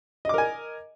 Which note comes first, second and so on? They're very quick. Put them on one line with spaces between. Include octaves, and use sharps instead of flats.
D#5 D6 A#4 G#5